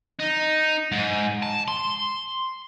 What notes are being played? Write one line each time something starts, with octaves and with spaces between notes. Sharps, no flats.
D#4
G#2
A5
C6